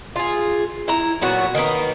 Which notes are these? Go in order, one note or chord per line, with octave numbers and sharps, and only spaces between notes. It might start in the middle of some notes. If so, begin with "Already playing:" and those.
F4 G#4
E4 A#5
A#2 F#3 B3 F#4
D#3 A#3 B3 D#4